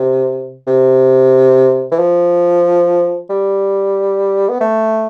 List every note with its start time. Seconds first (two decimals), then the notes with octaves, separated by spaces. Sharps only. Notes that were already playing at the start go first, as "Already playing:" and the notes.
Already playing: C3
0.67 C3
1.92 E3
1.99 F3
3.30 G3
4.49 B3
4.61 A3